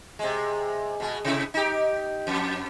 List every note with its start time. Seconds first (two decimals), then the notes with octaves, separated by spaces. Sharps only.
0.19 C3 G#3
1.00 B2 G#3
1.25 C3 E4
1.54 D#4 G4
2.27 F2